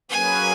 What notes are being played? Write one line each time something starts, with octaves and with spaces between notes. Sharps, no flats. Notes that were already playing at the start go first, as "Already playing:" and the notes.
F#3 A#3 C#4 G#4 B4 G#5